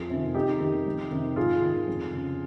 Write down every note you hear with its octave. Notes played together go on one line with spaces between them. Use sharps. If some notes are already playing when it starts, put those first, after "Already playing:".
Already playing: F2 F4 G#4
C3 D#3
F2 D#4 G4
D#3
F2
C3 D#3
G#2 F4 G#4
D#3
F2
C#3